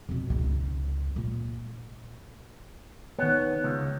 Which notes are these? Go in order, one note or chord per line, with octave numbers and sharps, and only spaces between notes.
F2 B2
C#2 D#4
A#2
D#3 B3 C#5
C#2 D#3